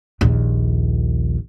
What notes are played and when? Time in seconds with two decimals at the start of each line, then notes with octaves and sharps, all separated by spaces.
0.21 A#1 D#2